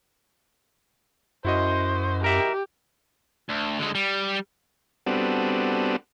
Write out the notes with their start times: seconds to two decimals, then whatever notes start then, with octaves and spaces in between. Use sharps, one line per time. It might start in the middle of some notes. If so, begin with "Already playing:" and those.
1.45 F#2 E4 F#4 C5 D#5
2.24 G4 A#4 E5
3.49 D2
3.79 D3 G#3
3.95 G3
5.06 G3 B3 C4 D4 F#4 A4